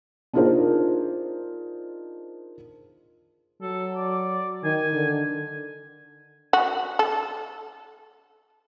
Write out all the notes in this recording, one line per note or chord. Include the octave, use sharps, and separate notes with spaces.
D4 D#4 F4 G#4 A#4 C5
F#3 A4
D5
D#3 G#5
D3
F#4
A4